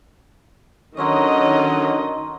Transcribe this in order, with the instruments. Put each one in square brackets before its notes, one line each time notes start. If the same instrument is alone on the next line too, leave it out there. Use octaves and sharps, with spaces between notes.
[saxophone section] D3 F#3 C#4 [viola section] D#3 D#5 [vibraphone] A#5 C6 C#6